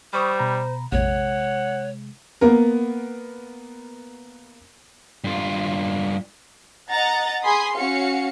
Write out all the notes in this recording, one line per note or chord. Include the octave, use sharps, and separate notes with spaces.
G3 C5 B5 C#6 D#6
B2 A#5 B5
A#1 F2 C3 G#3 C#5 F#5
A#3 B3 A#4
G2 F4
D#5 F#5 A#5 A6
G#4 G#5 B5 C6 D#6
C#4 F#4 F5 C#7